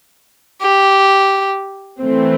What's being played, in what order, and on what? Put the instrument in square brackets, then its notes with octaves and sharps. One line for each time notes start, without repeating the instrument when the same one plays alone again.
[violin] G4
[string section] E3 A3 C4